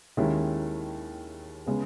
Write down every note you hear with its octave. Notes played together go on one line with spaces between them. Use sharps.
D#2 D#3 G#3 C#4 E4
C#3 G#3 B3